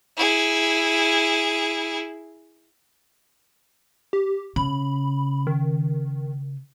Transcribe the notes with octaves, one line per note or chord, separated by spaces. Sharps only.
E4 G#4
G4
C#3 B5
D#3